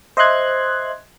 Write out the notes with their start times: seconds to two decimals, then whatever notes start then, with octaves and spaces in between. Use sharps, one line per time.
0.17 C5 D#5 E5 C6 F#6 G#6